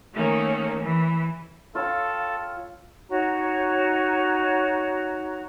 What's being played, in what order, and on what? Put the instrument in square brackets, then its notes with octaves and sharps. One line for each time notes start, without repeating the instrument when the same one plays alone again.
[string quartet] D#3 A3 A#3 C#4
E3
[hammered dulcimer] F4 C#5 G5 [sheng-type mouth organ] A4 [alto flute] F5
[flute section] D#4 F#4 C#5 A#5